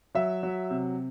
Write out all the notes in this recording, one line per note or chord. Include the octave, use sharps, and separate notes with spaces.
F#3 E5
F#3
C3